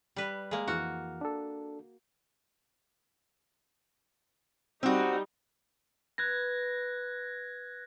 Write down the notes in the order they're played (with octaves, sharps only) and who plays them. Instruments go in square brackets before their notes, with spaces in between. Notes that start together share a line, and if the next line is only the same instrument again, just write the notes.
[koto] G3 B4
G#3 A#3
[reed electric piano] F2 E3 F6 [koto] F#4
[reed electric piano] D4 A4
[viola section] G3 D#4 [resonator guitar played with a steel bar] C4 F#4
[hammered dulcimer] B4 [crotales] F#6 G#6 A#6